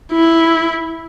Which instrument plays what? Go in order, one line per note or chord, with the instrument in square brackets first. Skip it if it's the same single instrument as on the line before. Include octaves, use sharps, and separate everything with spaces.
[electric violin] E4